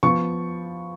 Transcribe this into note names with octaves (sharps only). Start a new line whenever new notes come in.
F3 B3 C#6